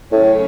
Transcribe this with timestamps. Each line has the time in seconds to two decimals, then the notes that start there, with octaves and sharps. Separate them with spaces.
0.12 A2 C#3 F#3 A3 C#4